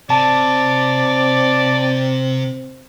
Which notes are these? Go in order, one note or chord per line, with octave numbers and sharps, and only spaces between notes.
C3 C4 D5 A5